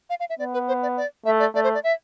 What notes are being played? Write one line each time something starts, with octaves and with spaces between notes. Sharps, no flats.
F5
F5
E5
B3 D5
B4
C5
D5
D5
A3 E5
D5
A3 D5
C5
D5
E5